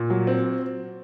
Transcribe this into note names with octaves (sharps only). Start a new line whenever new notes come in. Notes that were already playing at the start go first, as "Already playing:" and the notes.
Already playing: A#2
F#3
C4